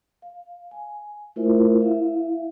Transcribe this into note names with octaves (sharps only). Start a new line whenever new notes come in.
F5
G#5
A3 E4 F4 A#4 C5 E5
E4 E5 F5